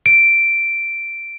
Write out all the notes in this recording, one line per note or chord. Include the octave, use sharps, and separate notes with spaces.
D7